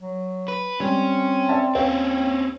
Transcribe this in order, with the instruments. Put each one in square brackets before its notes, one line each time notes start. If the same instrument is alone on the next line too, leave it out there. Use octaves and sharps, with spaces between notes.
[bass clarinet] F#3
[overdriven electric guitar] B4
[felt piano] G3 [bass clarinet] C4 [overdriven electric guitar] C#4
[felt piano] D5 E5 A5
[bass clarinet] D#2 [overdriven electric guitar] C4 C#4 [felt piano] C#5 F5 G5